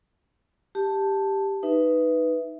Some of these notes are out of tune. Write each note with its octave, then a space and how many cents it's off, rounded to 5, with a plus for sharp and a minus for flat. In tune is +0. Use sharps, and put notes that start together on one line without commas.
G4 +0 A5 +0
D#4 +0 B4 +0 E5 +0